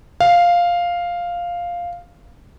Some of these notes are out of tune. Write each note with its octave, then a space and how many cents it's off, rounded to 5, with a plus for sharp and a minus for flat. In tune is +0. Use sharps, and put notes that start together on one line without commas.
F5 +0